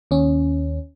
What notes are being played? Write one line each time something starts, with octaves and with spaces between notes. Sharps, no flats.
D#2 C#4